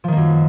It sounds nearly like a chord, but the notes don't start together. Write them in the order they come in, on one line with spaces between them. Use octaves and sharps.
F3 D#3 A#3 F#2